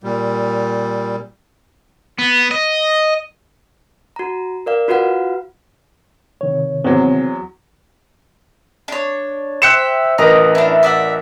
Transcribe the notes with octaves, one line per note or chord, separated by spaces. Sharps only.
A#2 G3
B3
D#5
F#4 A#5
A#4 D5 F5
F4 F#4 B4 F5 F#5
C3 D#3 C#5
E2 F#3 C4
D4 C#5
C5 E5 G5 F#6 C#7 E7
A1 A#4 B4 D#5 A#5 D#6
D4 E4
D5 E5 F#5